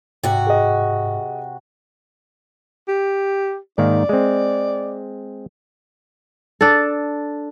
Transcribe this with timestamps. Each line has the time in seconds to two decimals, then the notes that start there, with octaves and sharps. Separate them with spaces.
0.23 G#2 C3 F#4
0.47 G#4 D#5
2.88 G4
3.78 G#2 D#3 A#3 D5
4.09 G#3 C4
6.61 D4 A4